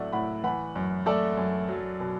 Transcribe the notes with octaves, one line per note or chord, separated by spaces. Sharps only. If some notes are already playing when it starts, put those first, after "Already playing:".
Already playing: A2 F#3 A3 D5 F#5
A2 F#5 B5
E3 F#5 B5
F#2
A3 A4 D5
F#2
F#3
B2